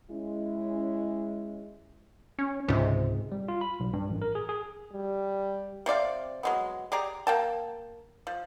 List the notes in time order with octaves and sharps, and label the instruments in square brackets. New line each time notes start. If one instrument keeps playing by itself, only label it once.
[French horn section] G#3 C#4 E4
[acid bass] C#4
[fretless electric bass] C#2 C3 [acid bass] G#2
[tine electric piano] G3
F4
B5
B1
G2
A1
A#4
G#4
G#4
[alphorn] G3
[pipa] C3 C4 D5 F5
F#3 G#3 B3
G4 G#4 D5 A#5
A#3 G5 A5
F3